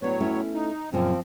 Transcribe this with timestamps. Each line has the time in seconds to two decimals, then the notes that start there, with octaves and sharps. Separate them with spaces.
0.02 A2 F#3 B3 D4 C#5
0.20 A3 C#4 E4
0.54 D#4
0.93 F#2 A#2 C#3 F3 C4